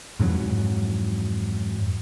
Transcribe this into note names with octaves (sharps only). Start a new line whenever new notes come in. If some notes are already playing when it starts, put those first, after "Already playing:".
F2 G#2 E3 F#3